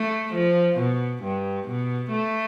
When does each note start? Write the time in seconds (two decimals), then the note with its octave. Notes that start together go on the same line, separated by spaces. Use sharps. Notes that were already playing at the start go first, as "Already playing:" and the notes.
Already playing: A3
0.33 F3
0.78 B2
1.23 G2
1.68 B2
2.12 A3